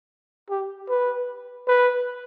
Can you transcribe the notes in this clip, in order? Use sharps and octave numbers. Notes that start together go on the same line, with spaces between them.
G4
B4
B4